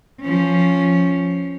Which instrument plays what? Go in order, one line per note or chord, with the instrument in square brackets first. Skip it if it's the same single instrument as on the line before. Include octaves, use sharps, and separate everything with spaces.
[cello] F3 C#4